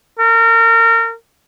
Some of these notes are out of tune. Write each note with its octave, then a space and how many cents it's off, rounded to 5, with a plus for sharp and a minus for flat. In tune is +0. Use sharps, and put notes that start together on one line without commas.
A#4 -30